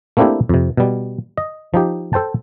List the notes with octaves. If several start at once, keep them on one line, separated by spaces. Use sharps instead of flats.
A3 A#3 C4 D4 E4 G4
F2 C3
B2 G3
D#5
F3 D#4 G4
A4 C5 G5 A5